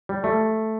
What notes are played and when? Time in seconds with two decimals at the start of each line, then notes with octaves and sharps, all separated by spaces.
0.09 G3
0.24 A3